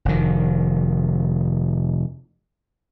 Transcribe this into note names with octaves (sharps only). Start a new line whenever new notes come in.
F1 D#3